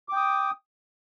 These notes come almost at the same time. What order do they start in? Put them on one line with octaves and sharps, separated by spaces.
D6 G5 D#6